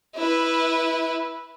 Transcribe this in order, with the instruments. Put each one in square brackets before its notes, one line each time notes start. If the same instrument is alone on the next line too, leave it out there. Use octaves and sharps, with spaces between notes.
[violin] E4 B4